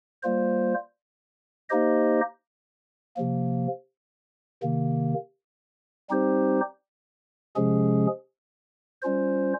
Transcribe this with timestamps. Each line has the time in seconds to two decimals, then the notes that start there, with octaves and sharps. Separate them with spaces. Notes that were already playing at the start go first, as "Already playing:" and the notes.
0.23 G3 A#3 F4 C5
1.69 A#3 D#4 G4 C5 D#5
3.16 C3 F3 A#3
4.63 C3 D#3 A#3
6.09 G3 C4 D#4 G4 C5
7.56 C3 F3 G#3 C#4 G#4
9.02 G3 C#4 F4 C5